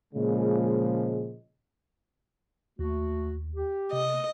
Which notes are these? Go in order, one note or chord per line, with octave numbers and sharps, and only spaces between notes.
A#2 C#3 F3 G#3
D#2 A3 F#4
G4
C3 D#5